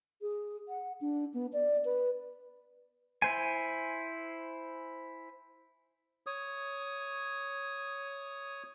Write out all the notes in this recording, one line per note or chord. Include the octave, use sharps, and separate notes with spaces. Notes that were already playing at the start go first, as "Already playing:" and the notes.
G#4
F#5
D4
B3
D5
B4
E4 C5 G#5
C#5 D#6